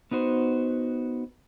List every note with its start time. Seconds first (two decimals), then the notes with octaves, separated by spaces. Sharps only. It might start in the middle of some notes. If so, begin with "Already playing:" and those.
0.11 B3 D#4 F#4 C5